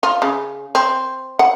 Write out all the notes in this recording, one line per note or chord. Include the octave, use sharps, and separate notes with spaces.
F4
C#3
C4
F#5